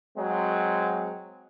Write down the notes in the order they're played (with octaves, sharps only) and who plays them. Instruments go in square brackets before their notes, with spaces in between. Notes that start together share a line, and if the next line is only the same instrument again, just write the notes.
[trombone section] F#3 G#3 C4